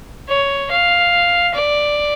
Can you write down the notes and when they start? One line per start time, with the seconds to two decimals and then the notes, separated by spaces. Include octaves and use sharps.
0.29 C#5
0.71 F5
1.54 D5